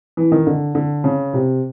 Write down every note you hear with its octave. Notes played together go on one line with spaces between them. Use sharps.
E3
D#3
D3
D3
C#3
C3